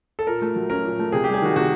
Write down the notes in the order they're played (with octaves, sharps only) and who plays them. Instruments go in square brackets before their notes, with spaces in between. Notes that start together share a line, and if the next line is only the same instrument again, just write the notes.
[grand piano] A4
[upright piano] A#2 [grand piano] A#4
[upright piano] A3
F#3
[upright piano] C#4 [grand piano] A#4
[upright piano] A#2
A3
[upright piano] C3 [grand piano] G#4
[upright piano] G3 [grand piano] G4
[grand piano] G#4
[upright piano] D#3 [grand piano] F#4
[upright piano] C3 [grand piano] F#4